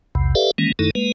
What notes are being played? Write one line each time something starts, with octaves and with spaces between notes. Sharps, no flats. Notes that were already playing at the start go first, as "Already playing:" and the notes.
B1 E2 C3
G4 A4 B4 D5 E5 F5
D#3 E3 G#3 A#3 C#4
F#2 D#3 A3 D#4 E4 A4
G#3 A#3 B4